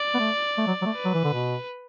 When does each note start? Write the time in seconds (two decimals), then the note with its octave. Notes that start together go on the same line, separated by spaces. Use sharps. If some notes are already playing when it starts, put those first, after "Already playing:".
Already playing: D5
0.14 B3
0.19 A3
0.58 A3
0.67 F#3
0.82 F#3
0.86 A3
0.96 B4
1.05 F#3
1.14 E3
1.24 D3
1.33 B2